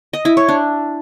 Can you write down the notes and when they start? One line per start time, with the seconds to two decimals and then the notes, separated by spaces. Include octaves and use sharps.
0.13 D#5
0.25 E4
0.37 C#5
0.49 D4